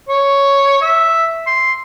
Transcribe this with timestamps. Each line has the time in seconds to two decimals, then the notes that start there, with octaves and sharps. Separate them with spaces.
0.09 C#5
0.82 E5
1.47 C6